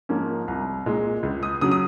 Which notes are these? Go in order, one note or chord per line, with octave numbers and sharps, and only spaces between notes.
G#2 F3 A#3 C#4
C2 A#5
A#2 G#3
C#2
D#6
C#3 F#3 D#6
D#6